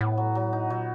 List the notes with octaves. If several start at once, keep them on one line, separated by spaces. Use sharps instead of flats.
A2 B3
F#3
F#3
D#4
A#2 F#3